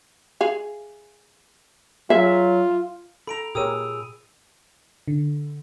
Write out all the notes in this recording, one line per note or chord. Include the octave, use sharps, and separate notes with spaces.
G#4 F5
F#3 F4 G#4 E5
A4 A#5 B5 D7 F7
A#2 G4 G#4 A#4 C#5 D#6 E6 D#7
D3